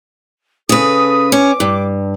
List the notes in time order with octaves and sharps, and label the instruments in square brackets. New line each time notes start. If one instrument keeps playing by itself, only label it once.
[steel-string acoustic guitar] C#3 B4 [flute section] A4 D#6
[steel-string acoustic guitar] C#4 [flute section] D6
[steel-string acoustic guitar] G2